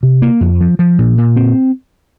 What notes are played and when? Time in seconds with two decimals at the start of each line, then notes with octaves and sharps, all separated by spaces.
0.03 C3
0.22 A#3
0.41 F2
0.60 F3
0.79 F3
0.99 A#2
1.18 A#2
1.36 C4